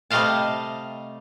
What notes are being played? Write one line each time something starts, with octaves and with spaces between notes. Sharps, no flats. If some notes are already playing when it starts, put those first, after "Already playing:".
C3 G3 A3 D#5 F5 A5